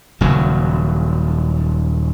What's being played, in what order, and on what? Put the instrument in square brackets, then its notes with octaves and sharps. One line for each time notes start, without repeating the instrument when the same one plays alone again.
[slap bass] D#1 C#3 F#3